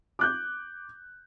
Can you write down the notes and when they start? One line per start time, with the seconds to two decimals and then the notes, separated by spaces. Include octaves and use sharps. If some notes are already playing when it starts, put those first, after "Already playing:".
0.19 D6 F#6 G6